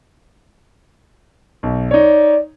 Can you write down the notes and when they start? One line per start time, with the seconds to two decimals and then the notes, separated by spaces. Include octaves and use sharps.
1.63 B1
1.91 D#4 C#5 D5